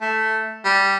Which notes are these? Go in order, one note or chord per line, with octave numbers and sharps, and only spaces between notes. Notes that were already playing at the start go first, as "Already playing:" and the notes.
A3
G3